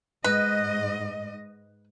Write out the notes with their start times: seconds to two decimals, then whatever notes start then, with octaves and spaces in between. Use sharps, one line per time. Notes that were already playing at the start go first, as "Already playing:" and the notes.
0.24 G#2 B4 D#5